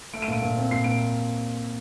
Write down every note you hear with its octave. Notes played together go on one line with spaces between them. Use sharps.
A3 D7
D#7
A#2 D7
A#2
C4
A#2 C7
A#2 D7